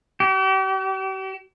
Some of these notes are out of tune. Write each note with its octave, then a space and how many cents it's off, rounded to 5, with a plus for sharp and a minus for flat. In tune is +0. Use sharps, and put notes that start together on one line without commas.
G4 -40